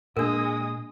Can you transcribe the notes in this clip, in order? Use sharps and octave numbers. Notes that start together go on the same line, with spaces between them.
A#2 G#3 A#3 D4 A#4 D#6